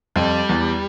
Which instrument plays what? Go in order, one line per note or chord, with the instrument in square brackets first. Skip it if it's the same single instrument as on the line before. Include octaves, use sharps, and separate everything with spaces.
[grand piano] F2 [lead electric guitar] G3
[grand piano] E2